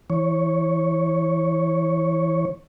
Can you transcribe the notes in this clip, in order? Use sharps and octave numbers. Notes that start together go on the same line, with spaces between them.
E3 C#5